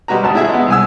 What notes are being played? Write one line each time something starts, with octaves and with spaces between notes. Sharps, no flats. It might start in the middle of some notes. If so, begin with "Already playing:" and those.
G3 G#3 F#4 B4 A#5
G#1 D2 A5
E4 F#4 G#4 E5
G#3 B3
C2 G#5 E6